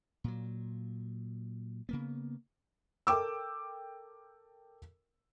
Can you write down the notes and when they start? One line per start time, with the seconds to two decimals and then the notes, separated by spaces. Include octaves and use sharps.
0.24 A#2 F#3
1.89 C#3 A#3 B3
3.07 A4 A#4 G5 D6 E6